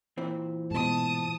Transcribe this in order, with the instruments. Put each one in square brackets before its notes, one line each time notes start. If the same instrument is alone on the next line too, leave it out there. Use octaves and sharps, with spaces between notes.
[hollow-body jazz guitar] A#2 E3 C4
[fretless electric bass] G#2 B2 [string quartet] A5 D#6